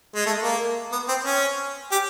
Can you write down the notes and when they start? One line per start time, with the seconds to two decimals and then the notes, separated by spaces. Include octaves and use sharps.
0.15 G#3
0.26 A3
0.43 A#3
0.92 B3
1.08 C4
1.25 C#4
1.91 G4